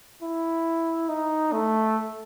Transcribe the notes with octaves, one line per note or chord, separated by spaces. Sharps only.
E4
D#4
A3